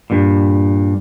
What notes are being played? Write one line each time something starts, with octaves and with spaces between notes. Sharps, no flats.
G2 A#2